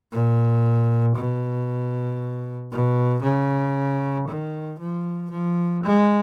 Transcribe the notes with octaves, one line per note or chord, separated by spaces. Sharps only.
A#2
B2
B2
C#3
D#3
F3
F3
G#3